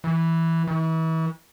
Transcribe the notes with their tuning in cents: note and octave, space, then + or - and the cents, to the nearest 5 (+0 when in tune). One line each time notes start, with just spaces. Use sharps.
E3 -5
E3 -35